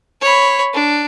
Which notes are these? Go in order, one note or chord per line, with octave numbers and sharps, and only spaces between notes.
C#5 B5
D4